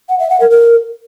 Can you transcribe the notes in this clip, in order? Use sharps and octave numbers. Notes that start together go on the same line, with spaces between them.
F#5
E5
F#5
A#4
A#4